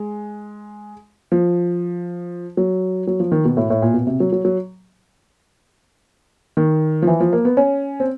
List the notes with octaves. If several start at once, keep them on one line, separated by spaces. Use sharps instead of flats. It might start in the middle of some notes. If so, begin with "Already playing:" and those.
Already playing: G#3
F3
F#3
F#3
F3
D#3
B2
A2
A2
A#2
B2
C3
F#3
F#3
F#3
D#3
F3
E3
F3
A#3
B3
C#4
C4